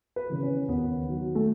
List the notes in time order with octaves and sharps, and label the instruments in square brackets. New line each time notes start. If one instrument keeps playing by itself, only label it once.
[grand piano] B4
C#3 E3
C#4
D#2 B3
D#3 F#3
A3